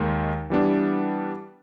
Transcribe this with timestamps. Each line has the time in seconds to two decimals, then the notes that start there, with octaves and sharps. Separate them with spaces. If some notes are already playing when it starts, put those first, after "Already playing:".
Already playing: D#2 D#3 G#3
0.50 E3 G3 B3 D4